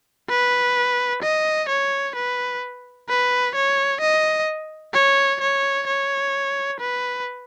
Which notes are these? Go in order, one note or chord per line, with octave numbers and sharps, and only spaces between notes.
B4
D#5
C#5
B4
B4
C#5
D#5
C#5
C#5
C#5
B4